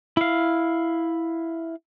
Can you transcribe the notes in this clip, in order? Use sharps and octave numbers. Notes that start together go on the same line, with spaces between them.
E4 F5